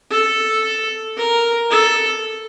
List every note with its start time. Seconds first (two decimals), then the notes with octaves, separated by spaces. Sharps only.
0.11 A4
1.17 A#4
1.71 A4